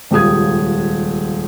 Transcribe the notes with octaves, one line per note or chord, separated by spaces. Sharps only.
D#1 C#2 G4 D#6 G#6